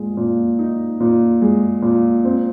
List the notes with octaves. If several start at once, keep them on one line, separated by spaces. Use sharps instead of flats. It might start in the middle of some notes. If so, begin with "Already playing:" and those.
Already playing: A#2 G#3
A#2
D#4
A#2
G#3
A#2
C4